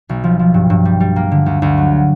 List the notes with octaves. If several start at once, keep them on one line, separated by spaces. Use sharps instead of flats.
B1
F3
F3
G2
G2
G3
G3
A#3
D3
D2
D2
F#3